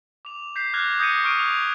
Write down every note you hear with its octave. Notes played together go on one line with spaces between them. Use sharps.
D6 F7
G6 B6 C7
D6 F6 F#6 G#6 A#6 F7
D#6 G6 A#6 C#7 D#7
C#6 F6 D7 D#7
G6 F7